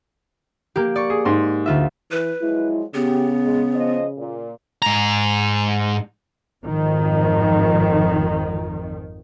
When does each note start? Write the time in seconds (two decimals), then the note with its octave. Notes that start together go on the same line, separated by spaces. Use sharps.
0.76 A#3 G4
0.96 D5 C#6
1.10 G#4
1.25 G#2 C6
1.66 D2 F4 E5
2.11 E3 B4
2.42 F3 F#3 G#3 E4
2.94 C#3 B3 G4
3.43 G#3 G#4
3.75 F3 C5 D#5
4.17 A#2
4.82 G#2 A#5
6.64 G#1 F2 D#3 F3